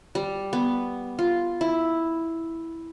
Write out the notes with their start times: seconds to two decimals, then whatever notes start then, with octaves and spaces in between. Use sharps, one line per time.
0.15 G3
0.53 B3
1.19 F4
1.61 E4